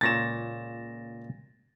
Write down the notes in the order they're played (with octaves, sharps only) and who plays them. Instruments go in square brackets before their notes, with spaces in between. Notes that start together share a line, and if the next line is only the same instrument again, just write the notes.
[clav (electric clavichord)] C#2 A#2 C#5 [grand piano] A6 A#6 E7